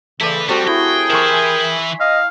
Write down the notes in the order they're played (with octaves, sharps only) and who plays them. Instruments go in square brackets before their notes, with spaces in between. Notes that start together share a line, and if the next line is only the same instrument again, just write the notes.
[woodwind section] C#3 E3 C4 [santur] A3 D5 [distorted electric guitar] E4 B4
[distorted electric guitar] G3 [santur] C4 G4 A4 [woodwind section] F#4
[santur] E4 [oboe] G#4 [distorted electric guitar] G5
[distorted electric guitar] E3 E4 [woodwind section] A#4 G5 [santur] A#5 C6 C#6
[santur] G#5
[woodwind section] D#5 [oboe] F5